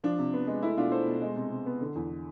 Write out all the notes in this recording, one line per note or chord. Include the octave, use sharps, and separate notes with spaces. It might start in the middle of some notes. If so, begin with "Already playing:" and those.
F3 D4
C3
B3
G#3
A3 E4
B2 D4 F4
A3 A4 C5
B2
G#3
C3
C3
B3
D3
E2